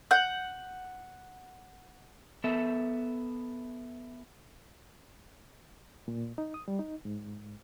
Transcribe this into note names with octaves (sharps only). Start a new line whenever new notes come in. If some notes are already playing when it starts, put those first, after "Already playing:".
F#5 G6
B3 A4 E5
A#2
D#4
D#6
G3
D#4
G#2